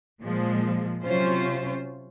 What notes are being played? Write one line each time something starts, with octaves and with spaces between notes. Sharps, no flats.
A#2 F3 G#3
C3 F#3 C#4 F4 C5